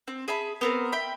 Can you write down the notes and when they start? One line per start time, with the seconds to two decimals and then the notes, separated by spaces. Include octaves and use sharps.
0.08 C4
0.28 G#4 E5 A5 B5
0.61 B3 C4 A#4
0.92 E5 G5 B5